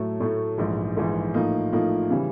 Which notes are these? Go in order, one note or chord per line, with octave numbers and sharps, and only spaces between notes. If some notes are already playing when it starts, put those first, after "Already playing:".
Already playing: A2 F#3 A3
A2 F#3 A3
A#1 G#2 E3
A#1 G#2 E3
A2 F3 A#3 D#4
A2 F3 A#3 D#4
C#3 E3 G3